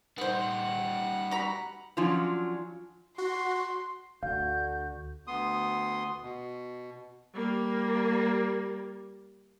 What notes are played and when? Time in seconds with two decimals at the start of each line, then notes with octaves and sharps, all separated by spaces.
0.18 G3 B3 D#4 C5 F#5
1.31 F#4 A#5 B5
1.97 F3 F#3 C#4 D4 F4
3.18 F#4 C6
4.23 D2 D3 F#4 F5 G6
5.27 D2 B3 C6 D#6
6.22 B2
7.33 G3 A#3